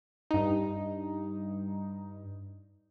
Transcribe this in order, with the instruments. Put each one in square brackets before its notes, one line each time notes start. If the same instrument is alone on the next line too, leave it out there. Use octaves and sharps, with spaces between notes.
[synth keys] G2 D#4